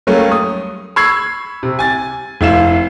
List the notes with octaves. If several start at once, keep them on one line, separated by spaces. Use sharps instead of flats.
F#3 G3 A3 A#3 C#4
D#6
B5 C#6 E6 G#6 C7
C3
G#5 A6
F1 E4 F5 E7